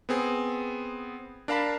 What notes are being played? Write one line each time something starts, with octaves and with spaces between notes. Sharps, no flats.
B3 C4 G#4
D4 A#4 F5 A5 B5 B6